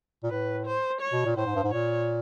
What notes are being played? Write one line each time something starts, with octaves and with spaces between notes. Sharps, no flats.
A#2
A2 B4
C5
C#5
B2
A#2
A2 C5
G#2
G2
G#2
A#2 C#5